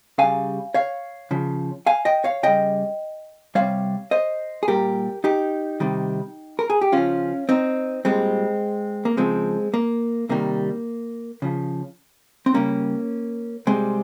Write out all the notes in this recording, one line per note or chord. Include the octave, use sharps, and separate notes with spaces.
C#3 G3 F5 G#5
C#5 F5
C#3 F3
F5 G#5
D#5 G5
C#5 F5
C#3 G3 D#5 G5
C3 D#3 G3 C#5 F5
C5 D#5
G#4
A#2 G3 G4 A#4
D#4 G4
C3 D#3 G3
A#4
G#4
G4
C#3 F3 C#4 F4
C4 D#4
A#2 G3 G#3 C4
A#3
C#3 F3 G#3 C4
A#3
C3 D#3 G3 A#3
C#3 F3
C4
C#3 G3 A#3 C#4
C3 G3 G#3 C4